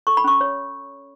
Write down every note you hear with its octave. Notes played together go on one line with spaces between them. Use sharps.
A4 C#6
B5
C#4 C#6
C#5